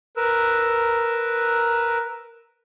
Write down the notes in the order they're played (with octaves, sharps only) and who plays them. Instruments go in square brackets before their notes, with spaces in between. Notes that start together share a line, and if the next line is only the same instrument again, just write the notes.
[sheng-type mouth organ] A#4 B4 E6